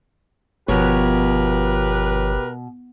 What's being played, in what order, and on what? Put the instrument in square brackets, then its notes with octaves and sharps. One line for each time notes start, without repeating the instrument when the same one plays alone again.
[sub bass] G1 [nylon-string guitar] B2 [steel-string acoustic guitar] F3 C#5 [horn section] G4 A#4 B4